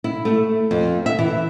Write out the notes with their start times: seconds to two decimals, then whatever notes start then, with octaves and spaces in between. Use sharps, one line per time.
0.04 E4
0.25 A3
0.71 F2
1.06 E5
1.19 E3